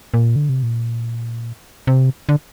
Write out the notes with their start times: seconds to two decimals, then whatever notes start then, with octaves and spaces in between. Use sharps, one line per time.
0.14 A#2
0.36 D3
0.49 C3
0.63 A#2
1.87 C3
2.29 D3